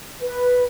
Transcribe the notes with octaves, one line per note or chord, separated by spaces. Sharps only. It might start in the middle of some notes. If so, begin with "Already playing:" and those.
B4